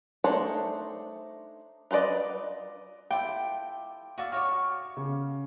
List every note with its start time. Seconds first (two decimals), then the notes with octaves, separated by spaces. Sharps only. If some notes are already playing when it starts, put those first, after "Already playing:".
0.24 A3 D4 D#4 C5 C#5
1.91 F4 B4 C5 D5 D#5
3.11 E4 F4 A4 G5 D6
4.18 F#4 D5 E5 F5
4.32 F#4 C#5 C#6 D6 F6
4.97 C#3